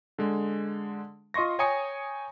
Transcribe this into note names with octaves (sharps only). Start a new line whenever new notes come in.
D3 G#3
F4 D#5 C6 C#6 A#6
C#5 G5 G#5 A#5 D#6 C#7